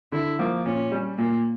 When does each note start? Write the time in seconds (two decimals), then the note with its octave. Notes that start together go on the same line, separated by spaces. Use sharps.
0.12 D3 E4
0.39 F3 A#3
0.65 A#2 C#4
0.92 G3 C#4
1.18 A#2 A#3